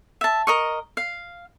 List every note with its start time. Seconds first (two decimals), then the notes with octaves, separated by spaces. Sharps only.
0.21 E5 A5
0.47 A#4 D#5 C#6
0.97 F5